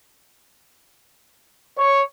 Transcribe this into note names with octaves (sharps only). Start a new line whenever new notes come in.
C#5